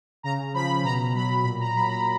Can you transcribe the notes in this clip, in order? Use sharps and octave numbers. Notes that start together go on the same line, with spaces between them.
C#3 A#5
F3 B5
B2 A#5
F#3 B5
A#2 B5
A#5
F#3 B5
A#5